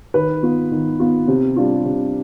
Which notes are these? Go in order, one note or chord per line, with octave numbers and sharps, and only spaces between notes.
D#3 B4
B3 F4
D#3
B3 F4
C3
G3 D4 F4
C3